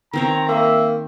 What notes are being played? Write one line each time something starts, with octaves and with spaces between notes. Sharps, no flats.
D#3 C4 C#5 A#5
A#3 E5